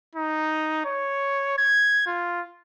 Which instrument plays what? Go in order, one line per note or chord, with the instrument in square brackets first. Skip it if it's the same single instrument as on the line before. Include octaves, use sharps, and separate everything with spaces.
[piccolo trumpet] D#4
C#5
G#6
F4